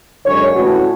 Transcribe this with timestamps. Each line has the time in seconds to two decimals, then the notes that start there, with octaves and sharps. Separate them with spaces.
0.24 F#2 D3 G#3 C#4 C#5
0.55 A2 E3 A3 C#4 F#4